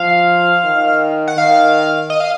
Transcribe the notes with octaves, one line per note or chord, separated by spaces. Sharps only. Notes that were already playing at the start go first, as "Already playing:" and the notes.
Already playing: F3 F5
D#3
F#5
D#3 F5
D#5
F5